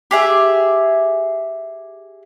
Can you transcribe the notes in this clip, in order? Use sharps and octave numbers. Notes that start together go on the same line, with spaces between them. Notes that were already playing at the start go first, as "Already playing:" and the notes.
G4 G#4 E5